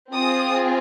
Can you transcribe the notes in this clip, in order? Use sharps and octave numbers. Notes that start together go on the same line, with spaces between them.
C4 F4 G#4 D#6